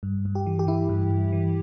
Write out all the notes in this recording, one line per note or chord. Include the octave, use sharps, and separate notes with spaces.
G2
G2
G4
E3
G4
E3 E4
G2
G2
E3